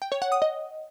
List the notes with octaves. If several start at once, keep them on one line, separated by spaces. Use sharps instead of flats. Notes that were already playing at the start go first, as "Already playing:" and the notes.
G5
C#5
F#5
D#6
D#5